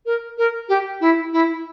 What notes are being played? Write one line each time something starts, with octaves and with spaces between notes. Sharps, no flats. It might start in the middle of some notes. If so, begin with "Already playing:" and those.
A#4
A#4
G4
E4
E4